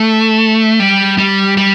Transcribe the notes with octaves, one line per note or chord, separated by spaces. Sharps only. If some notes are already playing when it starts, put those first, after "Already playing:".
Already playing: A3
G3
G3
G3